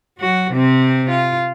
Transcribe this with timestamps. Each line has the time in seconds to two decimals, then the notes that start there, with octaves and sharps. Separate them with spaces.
0.18 F#3 F#4
0.52 C3 C4
1.11 F4